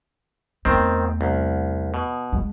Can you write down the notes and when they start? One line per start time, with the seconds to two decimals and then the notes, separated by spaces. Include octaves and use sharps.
0.65 E2 D#3 A3 C4
1.21 C2
1.94 B2
2.33 G#3